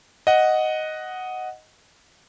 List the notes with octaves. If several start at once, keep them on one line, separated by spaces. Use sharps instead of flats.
D#5 F#5